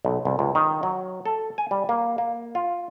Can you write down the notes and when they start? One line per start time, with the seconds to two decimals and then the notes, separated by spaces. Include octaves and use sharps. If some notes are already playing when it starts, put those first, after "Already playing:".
0.05 B1
0.25 C2
0.39 C#2
0.55 D#3
0.83 F#3
1.26 A4
1.58 G#5
1.71 G3
1.89 A#3
2.18 A#3
2.55 F4